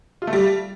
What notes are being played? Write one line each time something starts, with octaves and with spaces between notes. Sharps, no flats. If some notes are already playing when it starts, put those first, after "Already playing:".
F4
A3
G3